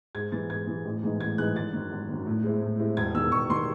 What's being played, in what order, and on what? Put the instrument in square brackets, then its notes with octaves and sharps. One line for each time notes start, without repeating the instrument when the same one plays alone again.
[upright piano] G#2 G#6
E3 G#3 A6
G#2 G#6
E3 G#3
A1
G#2 E3 G#3 D#4
A1 G#6
G#2 E3 G#3 D#4 F#6
G#1 A6
F#2 D#3
G#1
F#2 D#3
A2
G#3 C4 E4
A2
G#3 C4 E4
E1 G#6
E2 D#3 E6
E1 C#6
D#3 C6